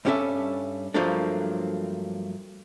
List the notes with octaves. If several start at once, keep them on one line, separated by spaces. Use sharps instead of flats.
G2 G3 C#4 G4 A4 E5
G2 F3 F#3 A3 A#3 D4